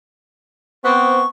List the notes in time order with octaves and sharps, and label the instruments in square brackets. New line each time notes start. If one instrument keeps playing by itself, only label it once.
[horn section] B3 C4 [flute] C#6